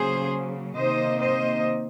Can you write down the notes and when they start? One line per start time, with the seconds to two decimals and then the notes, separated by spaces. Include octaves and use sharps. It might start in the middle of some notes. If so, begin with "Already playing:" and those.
Already playing: C#3 F#3 A#3 G#4 C5
0.76 C3 D#3 A#3 C5 D#5
1.22 C5 D#5